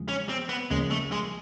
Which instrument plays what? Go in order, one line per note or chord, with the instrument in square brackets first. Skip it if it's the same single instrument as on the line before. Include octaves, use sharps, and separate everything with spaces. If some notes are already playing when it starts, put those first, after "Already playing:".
Already playing: [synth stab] E2 C#3 F3 G#3
[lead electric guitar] C#4
C4
B3
[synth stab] D2 C#3 F3 A#3 C#4 [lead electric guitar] G#3
[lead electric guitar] A3
G#3